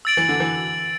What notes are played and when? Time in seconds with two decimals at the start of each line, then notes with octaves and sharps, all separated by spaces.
0.05 E6 A6 D7 F#7
0.17 E3
0.29 D3
0.40 E3